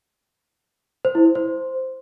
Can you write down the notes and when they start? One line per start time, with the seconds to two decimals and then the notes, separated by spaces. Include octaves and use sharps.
1.05 C5
1.15 E4
1.25 C5
1.35 C5